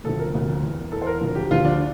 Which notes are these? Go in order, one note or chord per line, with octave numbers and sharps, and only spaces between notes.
E1 D2 C3 F3 A4
A#4
E1 D2 C3 F3
E2 E3
E2 E3 A4
C5
A#4
D2 D3 F3
G4
D2 D3 F3 F4
D4